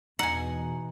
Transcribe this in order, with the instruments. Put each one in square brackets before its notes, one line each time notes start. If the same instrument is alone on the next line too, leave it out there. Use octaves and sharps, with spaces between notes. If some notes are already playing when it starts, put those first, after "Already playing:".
[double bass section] E2 B2 [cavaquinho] D#4 G#5 [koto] F#5